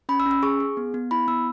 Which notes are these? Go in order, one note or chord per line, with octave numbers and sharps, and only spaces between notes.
C#4 B5
E6
C#4
E6
G#4 C#6
G#4
B3
B3
E4 B5
B3 E6